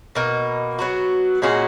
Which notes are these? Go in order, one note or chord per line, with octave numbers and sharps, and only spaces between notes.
B2 A#3 D#4
F#3 B3 F#4
A#2 G#3 C#4 F#4